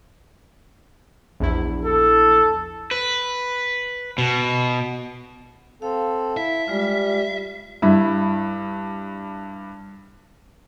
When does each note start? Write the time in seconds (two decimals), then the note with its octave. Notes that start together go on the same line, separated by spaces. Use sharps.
1.40 A#1 E2 E4
1.85 A4
2.91 B4
4.18 B2
5.82 C4 A4 F5
6.37 E4 E5
6.68 G3 G#3 F4
7.82 G2 E4